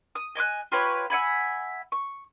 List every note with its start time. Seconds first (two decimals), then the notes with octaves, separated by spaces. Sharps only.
0.15 D#6
0.35 D#5 G#5 D6 F#6
0.72 F4 G4 B4 C#5
1.10 E5 F#5 G#5 B5
1.92 C#6